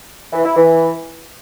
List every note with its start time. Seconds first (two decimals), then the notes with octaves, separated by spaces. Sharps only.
0.33 E3
0.45 E4
0.56 E3